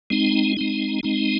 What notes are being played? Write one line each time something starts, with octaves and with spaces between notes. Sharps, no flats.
G#3 C4 D#4
G#3 C4 D#4
G#3 C4 D#4